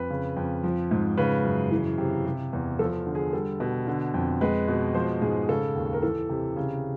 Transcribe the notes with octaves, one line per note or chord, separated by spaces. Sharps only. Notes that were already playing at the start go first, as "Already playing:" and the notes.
Already playing: F2 B4
C#3
F2
F3
G#2
C#3 B4
F#2
E3
C3
C3
E2
F3 A4
D3
G#4
G3 A4
B2
D3
F2
G#3 B4
B2
F3 C5
G#2 G#4
C#3 A4
D#2
A#4
E3 A4
C3
C#3